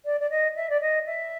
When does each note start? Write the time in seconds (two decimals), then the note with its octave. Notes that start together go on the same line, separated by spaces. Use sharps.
0.05 D5
0.20 D5
0.30 D#5
0.55 E5
0.69 D5
0.81 D#5
1.05 E5